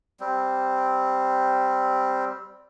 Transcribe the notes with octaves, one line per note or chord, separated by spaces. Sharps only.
G3 C4